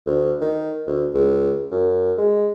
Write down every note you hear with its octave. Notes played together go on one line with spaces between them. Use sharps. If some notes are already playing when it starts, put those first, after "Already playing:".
D2
D#3
D2
C#2
F#2
G#3